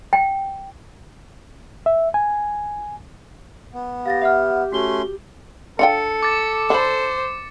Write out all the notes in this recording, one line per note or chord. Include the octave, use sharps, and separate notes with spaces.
G5
E5
G#5
B3
G4 F5 A6 A#6
E5 F#5 F6
A3 C#4 F#4 C6 G7
D4 F4 A4 G5 C#7
D6 A6
D3 C5 B5